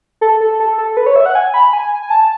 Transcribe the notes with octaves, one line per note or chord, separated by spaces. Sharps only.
A4
A4
A4
A4
B4
C#5
E5
F#5
G#5
B5
G#5
G#5
A5